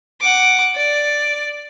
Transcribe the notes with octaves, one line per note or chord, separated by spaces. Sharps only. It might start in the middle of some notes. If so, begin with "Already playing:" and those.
F#5 D6
D5